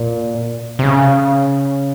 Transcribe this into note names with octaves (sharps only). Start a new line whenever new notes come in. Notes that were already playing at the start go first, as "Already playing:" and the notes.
Already playing: A#2
C3
C#3